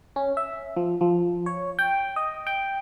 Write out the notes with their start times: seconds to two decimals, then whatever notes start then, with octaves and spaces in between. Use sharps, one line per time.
0.16 C#4
0.37 E5
0.77 F3
1.01 F3
1.46 C#5
1.79 G5
2.16 D#5
2.47 G5